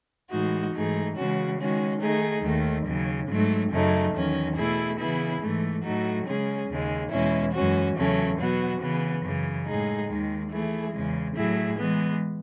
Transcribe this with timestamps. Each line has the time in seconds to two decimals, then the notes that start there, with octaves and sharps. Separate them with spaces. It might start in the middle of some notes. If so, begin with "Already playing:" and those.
0.31 A2 E3 G#3 D#4 F#4
0.74 G#2 E3 A3 D#4 G#4
1.16 C#3 E3 G#3 C#4 F#4
1.58 D#3 G#3 C#4 F#4
2.00 D#3 A3 D#4 G#4
2.43 D#2 D#3 A3
2.86 D#2 C#3 F#3
3.28 G#2 F#3 A3
3.71 F#2 C#3 F#3 A3 D#4
4.13 E2 D#3 F#3 C#4
4.55 B2 A3 E4 G#4
4.99 C#3 E3 B3 E4 G#4
5.41 G#2 E3 A3
5.83 A2 F#3 A3 D#4 F#4
6.25 C#3 G#3 C#4 G#4
6.68 D#2 C#3 G#3
7.11 E2 B2 G#3 C#4 E4
7.53 F#2 E3 G#3 C#4 F#4
7.96 E2 C#3 F#3 A3 C#4
8.38 B2 F#3 B3 F#4
8.80 C#3 E3 B3
9.22 F#2 C#3 E3
9.66 A2 G#3 D#4 G#4
10.08 D#2 D#3 G#3
10.50 E3 A3 E4 G#4
10.92 E2 C#3 G#3
11.36 A2 F#3 A3 E4 G#4
11.78 E3 G#3 B3